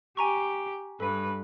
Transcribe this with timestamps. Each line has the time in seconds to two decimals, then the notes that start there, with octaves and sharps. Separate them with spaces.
0.17 G4 G#5 A#5 C#6
1.00 G2 A4 B4